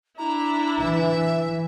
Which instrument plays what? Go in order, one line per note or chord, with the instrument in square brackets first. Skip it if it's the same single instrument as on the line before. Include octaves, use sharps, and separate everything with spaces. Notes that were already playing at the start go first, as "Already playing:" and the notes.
[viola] D4 E4 [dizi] A#5
[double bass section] E3 [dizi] E5